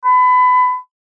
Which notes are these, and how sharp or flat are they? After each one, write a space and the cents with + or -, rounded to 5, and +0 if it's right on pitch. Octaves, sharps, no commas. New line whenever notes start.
B5 +25